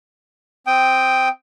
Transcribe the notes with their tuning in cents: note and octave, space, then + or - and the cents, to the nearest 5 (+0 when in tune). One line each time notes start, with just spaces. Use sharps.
C4 +0 G5 +0 D#6 +0